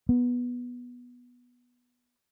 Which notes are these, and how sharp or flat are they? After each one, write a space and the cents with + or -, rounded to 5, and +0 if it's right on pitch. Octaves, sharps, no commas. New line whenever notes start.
B3 -10